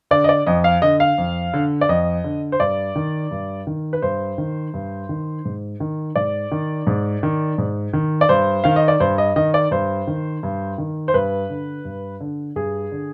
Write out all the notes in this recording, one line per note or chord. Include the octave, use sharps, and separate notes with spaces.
D3 D5
D#5
D5
F2 D#5
F5
D3 D#5
F5
F2
D3
D5
F2 D#5
D3
C5
G2 D5
D#3
G2
D#3
B4
G2 C5
D#3
G2
D#3
G#2
D#3
G#2 D5
D#3
G#2
D#3
G#2
D#3
D5
G2 C5
D#3 F5
D#5
D5
G2 C5
D#5
D#3 D#5
D5
G2 C5
D#3
G2
D#3
C5
G2 B4
D3
G2
D3
G2 G#4
D3